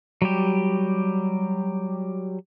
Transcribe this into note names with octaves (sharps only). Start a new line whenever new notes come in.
F#3 G3 G4